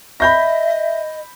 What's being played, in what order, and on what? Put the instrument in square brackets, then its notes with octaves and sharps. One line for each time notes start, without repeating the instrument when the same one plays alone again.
[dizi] D#5 [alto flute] E5 [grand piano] B5 G6 A#6